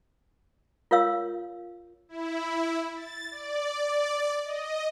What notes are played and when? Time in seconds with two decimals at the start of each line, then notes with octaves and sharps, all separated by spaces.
0.91 F4 A#4 C#5 F5 E6
2.09 E4
2.95 A6
3.31 D5
4.44 D#5